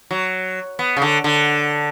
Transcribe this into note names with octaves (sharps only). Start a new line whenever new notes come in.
F#3
B3
C#3
D3
D3